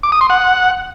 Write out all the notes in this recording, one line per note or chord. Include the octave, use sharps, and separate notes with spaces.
D6
D#6
C6
F#5